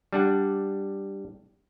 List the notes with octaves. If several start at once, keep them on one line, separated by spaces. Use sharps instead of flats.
G3 D4 F#5